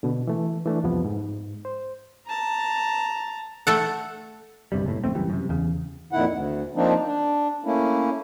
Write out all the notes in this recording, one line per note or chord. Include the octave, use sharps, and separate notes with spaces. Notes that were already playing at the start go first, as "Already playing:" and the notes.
B2 D3
E3 A3
E3 A3 D4
C2 F2 C3 F3 B3
G#2
C5
A5 A#5
A3 A4 F#5
G1 G2 C3 G3
F#1 B1 A2
A#1 F#2 A3 C4
C#2 F#2 E3 G3
F#2 C3
E2 C#3
F2 A#2 D#3 E4 F#5
D2
F3 A#3 C4 D4 D#4
D4
A3 A#3 C#4 E4